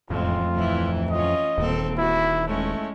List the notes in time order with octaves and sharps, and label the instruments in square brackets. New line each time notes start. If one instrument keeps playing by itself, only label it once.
[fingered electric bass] E1 A2 E3 [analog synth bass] F2 [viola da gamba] G#3 A3 C4 [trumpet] F4
[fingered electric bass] D1 A3 [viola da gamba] E3 E4
[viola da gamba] C#4 F4 [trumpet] D#5
[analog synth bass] D#1 [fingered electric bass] D#2 D#3 [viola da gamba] A#2 C4 A4
[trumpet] E4 [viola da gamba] F#4
[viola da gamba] G#3 C#4 E4 [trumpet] A3